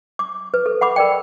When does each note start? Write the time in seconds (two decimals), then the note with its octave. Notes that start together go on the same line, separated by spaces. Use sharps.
0.19 D6
0.54 B4
0.66 A4
0.81 F#5 B5 D6
0.96 A#4 D5 G5